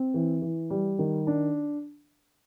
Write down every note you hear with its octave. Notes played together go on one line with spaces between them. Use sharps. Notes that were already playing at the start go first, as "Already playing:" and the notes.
Already playing: C4
E3
E3
G3
D#3
D4